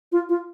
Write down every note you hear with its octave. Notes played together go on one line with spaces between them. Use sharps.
F4
F4